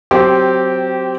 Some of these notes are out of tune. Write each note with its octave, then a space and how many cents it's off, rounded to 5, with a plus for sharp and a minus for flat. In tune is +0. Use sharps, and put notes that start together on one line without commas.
F#3 +0 C4 -5 G4 -20